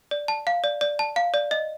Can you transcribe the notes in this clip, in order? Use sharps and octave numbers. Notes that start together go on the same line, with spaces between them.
D5
A5
F5
D5
D5
A5
F5
D5
D#5